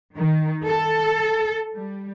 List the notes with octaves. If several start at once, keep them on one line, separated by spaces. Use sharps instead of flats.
D#3
A4
G3